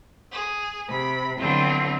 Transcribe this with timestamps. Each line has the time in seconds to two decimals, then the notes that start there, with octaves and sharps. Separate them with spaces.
0.31 G#4
0.89 C3 B5
1.38 D3 F#3 B3 C4 E4 F4